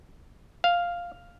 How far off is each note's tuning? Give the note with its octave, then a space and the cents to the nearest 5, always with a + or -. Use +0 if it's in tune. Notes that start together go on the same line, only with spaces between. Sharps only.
F5 +0